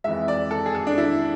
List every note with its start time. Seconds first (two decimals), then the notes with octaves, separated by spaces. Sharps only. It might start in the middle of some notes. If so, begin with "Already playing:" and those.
0.04 F2 E3 G#3 E5
0.28 D5
0.51 A4
0.66 G#4
0.75 A4
0.87 D4
0.98 E4